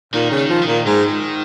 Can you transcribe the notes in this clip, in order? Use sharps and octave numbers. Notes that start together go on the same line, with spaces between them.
A#2 D#3
C#3
D#3
F3
D#3
A#2
G#2 D#3